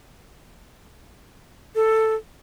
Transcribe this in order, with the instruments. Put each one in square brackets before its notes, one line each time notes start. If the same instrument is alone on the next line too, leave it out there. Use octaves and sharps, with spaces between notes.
[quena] A4